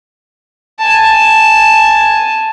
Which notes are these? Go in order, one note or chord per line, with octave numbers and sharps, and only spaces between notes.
G#5 A5